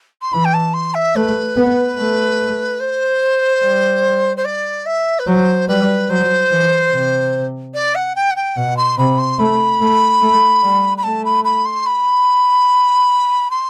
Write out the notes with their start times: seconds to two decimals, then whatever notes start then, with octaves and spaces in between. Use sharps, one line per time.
0.22 C6
0.33 E3 B5
0.45 G5
0.53 A5
0.73 C6
0.94 E5
1.15 A3 B4
1.56 B3
1.98 A3
2.80 C5
3.62 G3
4.37 C5
4.44 D5
4.86 E5
5.19 B4
5.27 F#3 C5
5.68 G3 B4
6.09 F#3 C5
6.51 E3
6.91 C3
7.74 D5
7.95 F#5
8.15 G5
8.31 F#5
8.36 G5
8.56 B2 F#5
8.77 C6
8.98 C3 B5
9.18 C6
9.39 A3 B5
9.80 A3
10.21 A3
10.62 G3
10.97 B5
11.03 A3 A5
11.25 B5
11.44 B5
11.65 C6
11.86 B5
13.51 C6